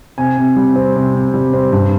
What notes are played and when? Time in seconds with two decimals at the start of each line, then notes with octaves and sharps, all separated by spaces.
0.18 C3 G#5
0.38 C3
0.56 G3
0.76 C4
0.96 C3
1.14 C3
1.34 G3
1.53 C4
1.73 G2